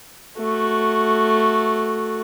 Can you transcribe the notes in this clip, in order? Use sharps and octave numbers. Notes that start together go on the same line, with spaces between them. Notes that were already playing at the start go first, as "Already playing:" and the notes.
A3 F#4